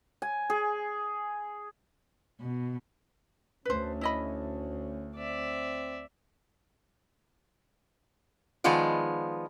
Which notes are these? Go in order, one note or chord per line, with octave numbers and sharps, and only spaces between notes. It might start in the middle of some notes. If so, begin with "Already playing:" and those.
G#5
G#4
B2
D2 C#4 B4 C5
E4 D#5 B5
C4 D5 E5
D#3 F3 G#3 B3 F4 D5